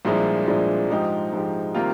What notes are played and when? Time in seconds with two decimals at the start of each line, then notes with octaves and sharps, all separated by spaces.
0.05 C2 A#2 F3 G#3 D4
0.48 C2 A#2 F3 G#3 D4
0.90 G#2 F3 G#3 D#4 G4
1.32 G#2 F3 G#3 D#4 G4
1.75 C3 D#3 G3 A#3 F4